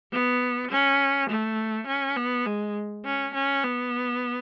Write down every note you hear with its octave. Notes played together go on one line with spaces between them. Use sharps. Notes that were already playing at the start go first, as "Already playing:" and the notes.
B3
C#4
A3
C#4
B3
G#3
C#4
C#4
B3